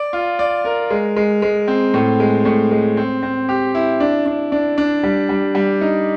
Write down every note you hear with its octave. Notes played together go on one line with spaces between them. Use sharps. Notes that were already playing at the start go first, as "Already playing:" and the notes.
Already playing: D5
F4
D5
A#4
G#3
G#3
G#3
C4
A2
G#3
A2
G#3
C4
C4
G4
E4
D4
D4
D4
D4
G3
G3
G3
D#4